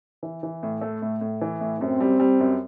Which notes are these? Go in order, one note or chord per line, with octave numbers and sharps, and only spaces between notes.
E3
E3
A2
A3
A2
A2
E3
A2
F#2 C4
G3
G3
F#2